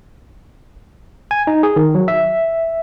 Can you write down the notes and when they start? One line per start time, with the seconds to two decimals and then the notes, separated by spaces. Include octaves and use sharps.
1.31 G#5
1.47 D#4
1.63 G#4
1.76 D#3
1.95 F#3
2.08 E5